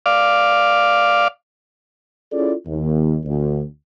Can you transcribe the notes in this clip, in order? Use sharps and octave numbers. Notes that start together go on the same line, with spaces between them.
D5 F5
C#4 E4 F4 G#4 A4 D5
D#2
D2